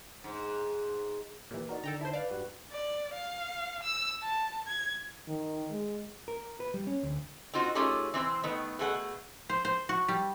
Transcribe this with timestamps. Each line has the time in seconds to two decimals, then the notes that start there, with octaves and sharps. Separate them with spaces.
0.24 G#2
1.51 A#2 E3 G4
1.69 D#4 F#4 A#4 D5
1.84 D3 D#3 A4 G5 A#5
2.01 E4 C5 A5
2.13 B4 D5 F5
2.31 G2 G3 F#4
2.72 D5
3.14 F5
3.83 E6
4.23 A5
4.68 G#6
5.28 D#3
5.71 G#3
6.28 A#4
6.60 B4
6.74 G3
6.87 C#4
7.03 D2
7.54 C4 D#4 F4 F#4
7.75 A3 C#4 D#4 F4 G4 G#4
8.14 E3 C4 C5
8.44 D#3 A3 B3
8.79 B2 A3 G#4 A#4 F#5
9.49 C5
9.65 C5
9.89 F#4
10.08 G3